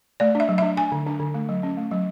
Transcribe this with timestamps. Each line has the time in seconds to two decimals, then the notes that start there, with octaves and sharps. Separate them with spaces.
0.20 A3 D5
0.35 D4
0.40 E5
0.49 F#3
0.58 D4 E5
0.77 D4 G#5
0.92 D3
1.06 D4
1.20 D3
1.34 A3
1.49 F#3
1.63 C#4
1.77 A3
1.91 F#3